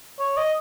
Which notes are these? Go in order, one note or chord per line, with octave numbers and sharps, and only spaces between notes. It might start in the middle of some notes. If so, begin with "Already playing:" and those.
C#5
D#5